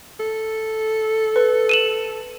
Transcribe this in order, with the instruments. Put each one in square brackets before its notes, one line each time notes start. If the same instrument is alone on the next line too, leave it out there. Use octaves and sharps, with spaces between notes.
[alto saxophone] A4
[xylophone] B4
D#7 E7 F#7